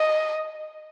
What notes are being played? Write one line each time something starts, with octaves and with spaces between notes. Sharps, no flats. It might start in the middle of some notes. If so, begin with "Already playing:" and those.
Already playing: D#5